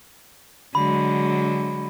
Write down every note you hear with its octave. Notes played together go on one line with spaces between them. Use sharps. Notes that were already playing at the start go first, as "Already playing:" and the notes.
D3 F#3 G#3 B5